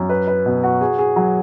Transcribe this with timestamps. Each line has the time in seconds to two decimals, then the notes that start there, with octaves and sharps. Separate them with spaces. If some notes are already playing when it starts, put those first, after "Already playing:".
Already playing: F#2
0.09 B4
0.27 B4
0.46 B2
0.64 F#4
0.81 G#4
0.99 G#4
1.16 F#3